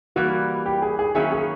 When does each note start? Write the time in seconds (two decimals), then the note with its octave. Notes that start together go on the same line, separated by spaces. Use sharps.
0.16 E3 G3 A#3 F#4
0.66 G4
0.82 G#4
0.99 G#4
1.15 D#3 F#3 A#3 C#4 E4 G#4
1.32 G#4